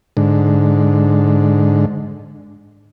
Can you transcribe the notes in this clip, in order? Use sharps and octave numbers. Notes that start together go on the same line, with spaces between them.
G#2 D3